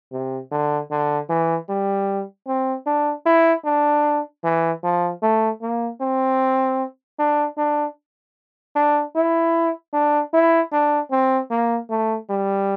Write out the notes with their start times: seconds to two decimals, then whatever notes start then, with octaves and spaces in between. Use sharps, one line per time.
0.12 C3
0.52 D3
0.91 D3
1.29 E3
1.69 G3
2.47 C4
2.86 D4
3.26 E4
3.65 D4
4.44 E3
4.83 F3
5.23 A3
5.62 A#3
6.01 C4
7.19 D4
7.58 D4
8.76 D4
9.16 E4
9.93 D4
10.34 E4
10.73 D4
11.11 C4
11.51 A#3
11.90 A3
12.30 G3